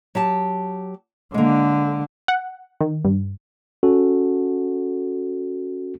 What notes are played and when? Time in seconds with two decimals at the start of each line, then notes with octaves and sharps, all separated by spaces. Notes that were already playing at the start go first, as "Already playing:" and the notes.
0.15 F#3 G4 A5
1.34 D3 G#3 A#3
2.28 F#5
2.81 D#3
3.05 G2
3.83 C#4 F#4 A4